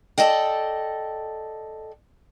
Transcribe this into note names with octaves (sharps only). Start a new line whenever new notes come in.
A4 D5 D#5 G5